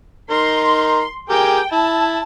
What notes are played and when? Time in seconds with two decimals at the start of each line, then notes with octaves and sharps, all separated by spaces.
0.31 D#4 A#4 C6
1.30 G4 G#4 A#4 G5
1.72 E4 A5